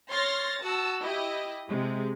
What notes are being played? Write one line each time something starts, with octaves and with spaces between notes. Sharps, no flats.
C#5 C6 F6 A6 A#6
F#4 A5 E6
E4 G4 D#5
C3 G#3